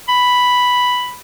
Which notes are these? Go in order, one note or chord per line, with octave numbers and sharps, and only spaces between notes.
B5